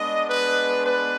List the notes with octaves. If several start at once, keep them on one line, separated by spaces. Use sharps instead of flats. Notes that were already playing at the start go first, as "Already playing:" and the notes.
Already playing: G#3 B3 D4 D#5
B4
B4